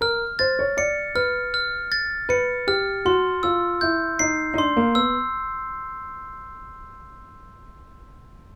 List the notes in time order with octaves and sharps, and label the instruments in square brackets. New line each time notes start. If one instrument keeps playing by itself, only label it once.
[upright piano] A#4 [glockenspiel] F6
[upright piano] C5 [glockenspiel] A6
[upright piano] C#5
[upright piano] D5 [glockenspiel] C#7
[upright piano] B4 [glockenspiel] F6
[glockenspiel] F6
A6
[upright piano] B4 [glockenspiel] C#7
[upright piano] G4 [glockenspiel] F6
[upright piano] F#4 [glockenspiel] C6
[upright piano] F4 [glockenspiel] E6
[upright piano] E4 [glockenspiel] G6
[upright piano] D#4 [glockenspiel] C7
[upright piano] D#4
[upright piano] D4 [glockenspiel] C6
[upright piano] A#3
[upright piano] B3 [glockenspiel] E6